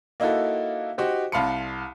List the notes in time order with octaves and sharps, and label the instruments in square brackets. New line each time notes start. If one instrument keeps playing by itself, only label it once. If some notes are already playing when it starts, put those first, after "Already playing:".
[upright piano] A#3 D#4 E4 F#4 A4
D#4 F#4 G4 C5
C2 F5 A5 B5 C6 C#7